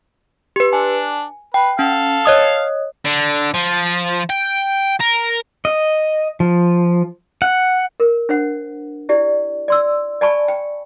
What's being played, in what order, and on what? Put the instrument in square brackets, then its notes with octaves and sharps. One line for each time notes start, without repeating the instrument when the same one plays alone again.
[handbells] G4 B4
[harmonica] D4 [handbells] G#5
[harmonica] B4 [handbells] G5
[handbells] C#4 [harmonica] A4 F5
[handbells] C#5 D#5 D#6
[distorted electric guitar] D3
F3
G5
A#4
[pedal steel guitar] D#5
F3
F#5
[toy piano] A#4
D4 C5 F#5
E4 G4 D5
D5 C6 E6
D5 G#5 A5 B5 C#6
G5